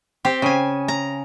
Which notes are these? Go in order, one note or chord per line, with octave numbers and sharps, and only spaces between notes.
C4 G4
C#3 G#5
A#5